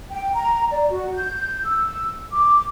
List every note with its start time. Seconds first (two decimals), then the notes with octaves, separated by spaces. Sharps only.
0.10 G5
0.34 A#5
0.71 D5
0.90 F#4
1.14 G6
1.64 E6
2.32 D6